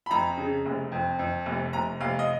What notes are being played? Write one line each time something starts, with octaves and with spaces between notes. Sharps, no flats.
B5
F2 A#5
C#3
F1
F2
F2
F1
F1 A#5
F1 F5
D#5